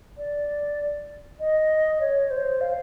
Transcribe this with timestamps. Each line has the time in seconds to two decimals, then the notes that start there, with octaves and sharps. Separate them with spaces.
0.18 D5
1.40 D#5
2.01 C#5
2.30 C5
2.61 F5